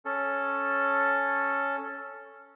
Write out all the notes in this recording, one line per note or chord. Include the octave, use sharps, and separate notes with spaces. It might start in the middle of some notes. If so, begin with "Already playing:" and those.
C#4 A4